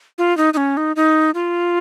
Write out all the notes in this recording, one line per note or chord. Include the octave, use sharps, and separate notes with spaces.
F4
D#4
D#4
C#4
D#4
D#4
F4